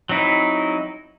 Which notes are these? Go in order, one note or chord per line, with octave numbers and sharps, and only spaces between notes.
F#3 C4 D#4 E4